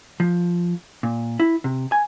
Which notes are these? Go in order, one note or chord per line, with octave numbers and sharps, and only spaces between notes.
F3
A#2
E4
C3
G#5